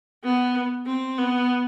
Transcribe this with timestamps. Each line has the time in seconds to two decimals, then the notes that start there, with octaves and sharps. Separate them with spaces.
0.24 B3
0.86 C4
1.18 B3